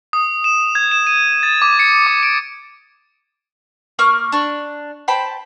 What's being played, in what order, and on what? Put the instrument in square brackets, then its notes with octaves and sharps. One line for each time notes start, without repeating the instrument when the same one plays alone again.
[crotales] D#6
E7
G#6
E7
D#7
A6
D6
C#7
D6
D7
[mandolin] A#3 A#4 C#6 F6
D4 C#6
C5 G5 A5 B5